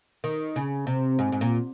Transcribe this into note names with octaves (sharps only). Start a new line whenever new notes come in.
D#3
C#3
C3
G#2
G#2
A#2